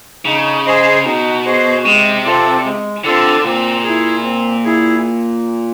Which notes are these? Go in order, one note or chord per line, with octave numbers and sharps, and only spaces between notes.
C#3 D#4
G#4 C5 D#5
B2 D#4
G#4 C5 D#5
C3 G#3
C4 F4 A4 D5
G#3
D3 C4 F4 A4 D5
A#2 C4
E4 G#4
C4
E4 G#4